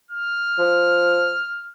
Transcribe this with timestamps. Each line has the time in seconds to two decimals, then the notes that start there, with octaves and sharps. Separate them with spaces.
0.11 F6
0.59 F3